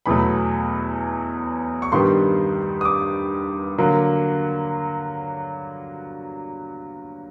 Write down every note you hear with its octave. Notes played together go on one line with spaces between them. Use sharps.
E2 B2 F#3 A3 B5
C#6
G2 D#3 G3 B3 C6
D#6
D6
D3 F#3 A#3